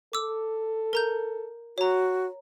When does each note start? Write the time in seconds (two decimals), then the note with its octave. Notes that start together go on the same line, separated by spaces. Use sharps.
0.13 A4 D6 E6
0.93 A#4 A#5 G6
1.78 F#4 C#5 A#5